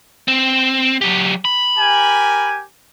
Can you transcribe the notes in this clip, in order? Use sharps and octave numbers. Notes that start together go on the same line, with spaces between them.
C4
F#3 G4
B5
G4 A#4 G#5